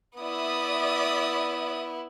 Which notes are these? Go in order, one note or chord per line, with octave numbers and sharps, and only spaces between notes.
B3 E4 D5 E5 D#6